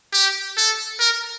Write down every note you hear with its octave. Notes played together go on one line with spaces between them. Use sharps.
G4
A4
A#4